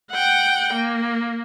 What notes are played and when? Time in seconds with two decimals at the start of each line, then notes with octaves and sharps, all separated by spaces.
0.11 F#5 G5
0.73 A#3